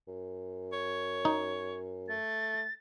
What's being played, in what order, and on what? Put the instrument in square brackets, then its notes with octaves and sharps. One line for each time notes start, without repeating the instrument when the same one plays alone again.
[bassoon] F#2
[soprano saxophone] C#5
[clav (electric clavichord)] D#4
[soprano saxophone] A3 [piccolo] A6